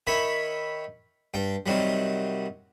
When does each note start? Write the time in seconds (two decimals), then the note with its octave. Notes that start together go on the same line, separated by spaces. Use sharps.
0.07 D#3 C#5 E5 B5
1.34 G2 G5
1.66 C3 D#3 F#3 G3